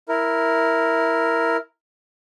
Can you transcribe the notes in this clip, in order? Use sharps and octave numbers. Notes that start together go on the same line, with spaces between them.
E4 A#4